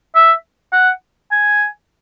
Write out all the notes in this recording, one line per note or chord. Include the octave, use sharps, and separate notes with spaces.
E5
F#5
G#5